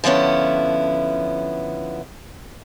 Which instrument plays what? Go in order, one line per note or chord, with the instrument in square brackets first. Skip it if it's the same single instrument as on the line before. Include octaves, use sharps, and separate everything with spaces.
[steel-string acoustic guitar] D3 F3 B3 C#4 E4